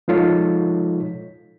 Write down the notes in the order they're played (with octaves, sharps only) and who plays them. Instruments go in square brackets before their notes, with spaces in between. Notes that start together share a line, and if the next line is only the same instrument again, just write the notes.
[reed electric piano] F3 G#3 D#4 F4 A4 C#5